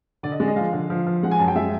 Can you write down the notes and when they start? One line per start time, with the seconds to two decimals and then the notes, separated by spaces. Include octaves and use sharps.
0.23 D3 D5
0.32 D#5
0.40 G#3 D5
0.48 D#5
0.56 F3 F5
0.73 D3
0.90 F3
1.07 F3
1.23 G#3 F#5
1.31 G#5
1.39 F#2 A5
1.48 G5
1.55 G#3 E5